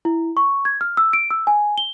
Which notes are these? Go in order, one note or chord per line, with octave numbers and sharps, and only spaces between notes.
E4
C#6
G#6
F6
E6
D7
E6
G#5
G7